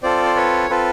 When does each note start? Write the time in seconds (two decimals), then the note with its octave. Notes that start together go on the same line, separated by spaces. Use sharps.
0.03 C4 F4 A4 C5 D5
0.25 C5
0.36 B4 C#5
0.69 C4 F4 A4 B4